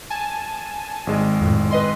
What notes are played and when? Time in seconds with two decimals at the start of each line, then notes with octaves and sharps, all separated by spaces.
0.10 G#5 A5
1.07 G#1 G#3
1.41 F2 A2
1.71 B4 D#5 C6